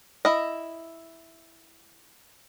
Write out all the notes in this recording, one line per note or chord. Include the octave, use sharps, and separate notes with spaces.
E4 D#5